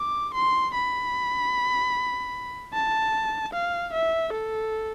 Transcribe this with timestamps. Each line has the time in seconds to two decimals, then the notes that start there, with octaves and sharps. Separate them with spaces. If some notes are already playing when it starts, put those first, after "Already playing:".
Already playing: D6
0.34 C6
0.74 B5
2.74 A5
3.53 F5
3.93 E5
4.33 A4